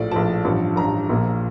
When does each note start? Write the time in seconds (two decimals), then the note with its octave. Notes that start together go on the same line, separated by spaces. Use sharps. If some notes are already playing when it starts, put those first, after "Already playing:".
Already playing: A#1 A2 F3 D5
0.11 A#1 A2 F3 A5
0.45 A1 G2 F3
0.76 A1 G2 F3 A#5
1.09 A#1 A#2 F3